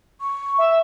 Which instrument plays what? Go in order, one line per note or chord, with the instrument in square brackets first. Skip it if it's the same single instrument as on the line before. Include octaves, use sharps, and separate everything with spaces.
[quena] C#6
[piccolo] E5